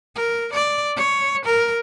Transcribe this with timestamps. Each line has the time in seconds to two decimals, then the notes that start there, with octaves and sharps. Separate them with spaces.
0.16 A#4
0.53 D5
0.96 C#5
1.45 A#4